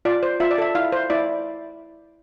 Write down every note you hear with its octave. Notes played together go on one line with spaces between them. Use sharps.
F4 D5
C5
F4 E5
D5
A4 E5
E4 F5
C5
E4 D5